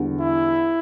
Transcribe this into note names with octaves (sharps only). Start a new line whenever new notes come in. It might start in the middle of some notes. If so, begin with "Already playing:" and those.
Already playing: E2 D3 G3
E4